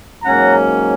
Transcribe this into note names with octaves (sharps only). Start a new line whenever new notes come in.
G#2 F#3 A#3 C#4 F#5 A#5